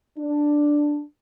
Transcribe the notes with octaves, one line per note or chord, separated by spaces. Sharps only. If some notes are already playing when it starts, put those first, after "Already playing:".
D4